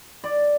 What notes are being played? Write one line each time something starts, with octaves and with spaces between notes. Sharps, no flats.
D5